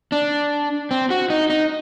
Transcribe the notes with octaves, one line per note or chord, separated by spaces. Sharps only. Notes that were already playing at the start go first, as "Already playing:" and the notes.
D4
C4
F#4
D#4
D#4